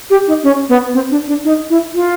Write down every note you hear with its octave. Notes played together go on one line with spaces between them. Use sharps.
G4
D#4
C#4
B3
C4
D4
D4
D#4
E4
F4